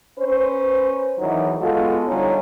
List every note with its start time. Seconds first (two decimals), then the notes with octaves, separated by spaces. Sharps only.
0.18 C#4 B4 C5
1.19 E2 D#3 E3 F#3 D#4
1.60 G#3 B3 F4 F#4 A4
2.07 D3 F3 G3 C#4 D#4